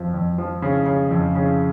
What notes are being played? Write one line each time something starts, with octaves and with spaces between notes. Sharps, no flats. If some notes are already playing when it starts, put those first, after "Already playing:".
Already playing: F2 F3
F2
F3
C#3
C#3
F2
C#3